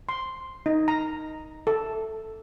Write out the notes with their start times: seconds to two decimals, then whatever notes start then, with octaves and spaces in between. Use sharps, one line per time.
0.09 C6
0.66 D#4
0.88 A#5
1.67 A4